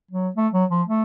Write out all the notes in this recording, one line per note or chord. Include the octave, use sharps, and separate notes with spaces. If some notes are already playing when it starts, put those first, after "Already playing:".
F#3
A3
F#3
F3
A3